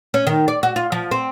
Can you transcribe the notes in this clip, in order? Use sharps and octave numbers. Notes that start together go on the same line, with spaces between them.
C#4
D#3
D5
F#4
F4
F3
C4